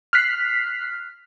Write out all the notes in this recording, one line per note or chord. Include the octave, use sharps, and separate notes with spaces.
F6 F#6 B6 C7